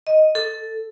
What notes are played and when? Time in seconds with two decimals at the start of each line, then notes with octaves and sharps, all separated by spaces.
0.07 D#5
0.35 A4